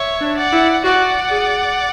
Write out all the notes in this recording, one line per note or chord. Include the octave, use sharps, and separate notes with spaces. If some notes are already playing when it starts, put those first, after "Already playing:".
Already playing: C#5 E5
D4
D5 F#5
E4
F#4 D5 F#5
G#4